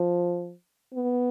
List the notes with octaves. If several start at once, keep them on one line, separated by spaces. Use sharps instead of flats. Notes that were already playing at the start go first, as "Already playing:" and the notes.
Already playing: F3
B3